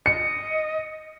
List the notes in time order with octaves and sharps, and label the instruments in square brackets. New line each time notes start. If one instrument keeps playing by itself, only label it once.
[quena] D#5 [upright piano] C#7